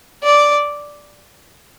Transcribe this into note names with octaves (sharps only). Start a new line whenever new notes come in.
D5